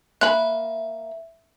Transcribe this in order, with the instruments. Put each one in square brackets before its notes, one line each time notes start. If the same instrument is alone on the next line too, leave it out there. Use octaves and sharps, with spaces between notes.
[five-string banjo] A#3 B5 [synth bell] E5 [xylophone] F#6